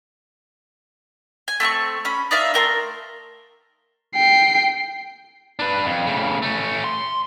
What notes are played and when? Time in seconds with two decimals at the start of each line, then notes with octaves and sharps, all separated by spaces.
1.48 G#5
1.60 A3 C4 G5 C#6
2.05 C#4 B5
2.31 D#4 D5 E5 F5
2.54 A3 A#4 G5 C6
4.16 G5 C7
5.59 D4 B4
5.86 F2
6.07 A2 C#3
6.42 A3 C#4
6.84 C6